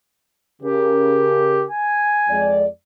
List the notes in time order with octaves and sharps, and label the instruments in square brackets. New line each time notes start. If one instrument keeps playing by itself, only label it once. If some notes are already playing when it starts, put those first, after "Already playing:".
[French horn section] C#3 A#4 [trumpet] G4
[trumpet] G#5
[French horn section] F2 G#3 D5